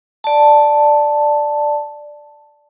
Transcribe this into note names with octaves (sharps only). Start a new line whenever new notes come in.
D5 A5